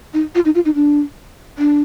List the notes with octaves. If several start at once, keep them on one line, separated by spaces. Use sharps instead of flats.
D#4
F4
D#4
F4
D#4
D4
D4